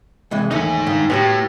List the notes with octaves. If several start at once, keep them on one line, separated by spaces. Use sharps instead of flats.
C2 E3 G#3
D#2 E3 A3 D#4 G#5
G2 D#3
A2 B3 F#4 G4